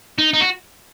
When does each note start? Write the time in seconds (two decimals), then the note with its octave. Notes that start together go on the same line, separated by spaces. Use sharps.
0.18 D#4
0.34 D#4
0.41 F#4